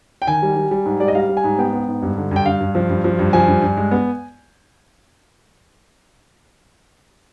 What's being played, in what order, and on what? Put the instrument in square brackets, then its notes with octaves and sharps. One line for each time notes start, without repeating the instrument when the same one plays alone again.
[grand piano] G5
D#3 G#5
G3
G3
G3
G#2
G3 D5
D#5
G3 F5
G3
G#5
G#2
B3 G5
B3
G#2
G2
D3
G2 G5
G2 F5
G2
F3
G2
F3
G2
F3 G#5
G2
G2
G#3
B3